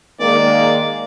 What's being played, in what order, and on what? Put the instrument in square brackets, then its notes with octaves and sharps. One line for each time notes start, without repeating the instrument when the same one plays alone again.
[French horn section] D#3 G#3 A#3 [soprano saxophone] D5